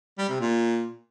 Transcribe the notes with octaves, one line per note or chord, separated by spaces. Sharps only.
G3
C3
A#2